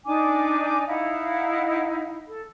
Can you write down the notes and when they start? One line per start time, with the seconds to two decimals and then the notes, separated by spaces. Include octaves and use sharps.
0.05 D4 D#4 G#5 D6
0.87 D#4 E4 F5 F#5
2.27 A4